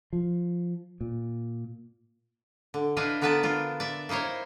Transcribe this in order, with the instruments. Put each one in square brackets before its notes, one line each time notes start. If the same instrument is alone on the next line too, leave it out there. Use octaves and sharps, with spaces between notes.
[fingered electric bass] F3
A#2
[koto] D3
D4 E4 B4 D#5 F5
D3 B3 A#4 B4 D5 A5
D4 F4
D5 E5
A#3 D#4 E4 C5 C#5